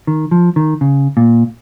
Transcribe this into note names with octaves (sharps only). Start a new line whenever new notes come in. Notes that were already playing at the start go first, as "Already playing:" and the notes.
D#3
F3
D#3
C#3
A#2